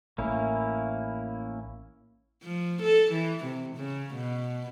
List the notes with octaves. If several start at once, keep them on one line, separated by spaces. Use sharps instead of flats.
A1 A#3 C#4 E4
F3
A4
E3
C3
C#3
B2